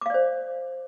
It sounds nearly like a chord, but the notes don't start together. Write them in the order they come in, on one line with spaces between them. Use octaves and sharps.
D6 F5 D5 C5